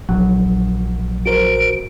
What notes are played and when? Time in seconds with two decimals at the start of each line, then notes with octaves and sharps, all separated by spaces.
0.09 A#1 F#3
1.26 F#4 A#4 C5 D7